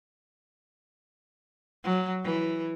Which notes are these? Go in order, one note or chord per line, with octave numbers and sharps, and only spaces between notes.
F#3
E3